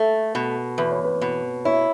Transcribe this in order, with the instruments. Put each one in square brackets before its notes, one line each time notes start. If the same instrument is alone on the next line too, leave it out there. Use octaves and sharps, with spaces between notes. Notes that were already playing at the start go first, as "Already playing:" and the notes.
Already playing: [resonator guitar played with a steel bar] A3 [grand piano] A4
[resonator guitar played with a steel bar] B2
[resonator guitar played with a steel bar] E2 [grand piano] B4
[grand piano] C#5
B4
[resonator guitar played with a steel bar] B2
[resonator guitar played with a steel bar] E4 [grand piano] C#5